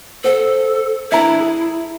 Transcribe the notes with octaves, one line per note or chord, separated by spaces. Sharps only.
A4 C5 F#5
E3 D4 E4 E5 A#5
G#4